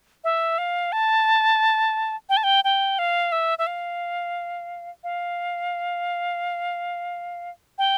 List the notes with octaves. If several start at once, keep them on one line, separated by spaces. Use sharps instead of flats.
E5
F5
A5
G5
A5
G5
G5
F5
E5
E5
F5
F5
G5